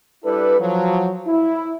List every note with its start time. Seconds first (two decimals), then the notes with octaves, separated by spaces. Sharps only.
0.25 G3 D4 E4 A4 B4
0.60 F3 F#3
1.27 E4